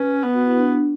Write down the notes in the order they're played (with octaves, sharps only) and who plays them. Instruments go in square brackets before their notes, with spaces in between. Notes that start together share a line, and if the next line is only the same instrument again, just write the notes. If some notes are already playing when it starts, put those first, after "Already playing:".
Already playing: [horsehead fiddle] C#4 [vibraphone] B4
[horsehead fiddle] B3
[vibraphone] F#4
E4
D4